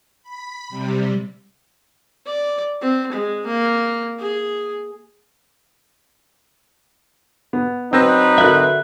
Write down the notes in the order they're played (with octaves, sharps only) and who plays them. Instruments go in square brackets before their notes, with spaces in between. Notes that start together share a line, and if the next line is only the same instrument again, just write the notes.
[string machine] B5
C3 G3
[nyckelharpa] D5
C4
G#3
A#3
G#4
[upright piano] B3
[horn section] F#3 D#4 B4 [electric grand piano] C4 [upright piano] E6 G6 A#6
[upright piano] D3 F#4 A#4 [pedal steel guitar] E5 F#6